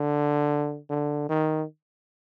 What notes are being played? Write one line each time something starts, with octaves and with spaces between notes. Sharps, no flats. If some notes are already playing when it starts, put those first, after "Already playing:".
Already playing: D3
D3
D#3